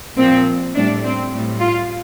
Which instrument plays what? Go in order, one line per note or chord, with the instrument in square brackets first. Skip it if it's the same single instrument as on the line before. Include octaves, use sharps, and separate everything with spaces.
[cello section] A#2 F3 C4
A2 G3 D4
C4
A2 G3
F4